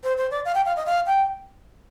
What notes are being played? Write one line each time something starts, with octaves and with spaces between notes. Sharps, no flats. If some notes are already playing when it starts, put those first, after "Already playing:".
C5
C5
D5
F5
G5
F5
D#5
F5
G5